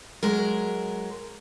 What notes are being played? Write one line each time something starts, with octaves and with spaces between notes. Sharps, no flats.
F#3 G#3 A#4